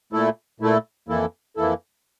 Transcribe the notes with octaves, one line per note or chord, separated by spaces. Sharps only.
A#2 A3 E4 A4
A#2 A3 E4 A4
F2 E3 A#3 E4 A4
F2 E3 A#3 E4 A4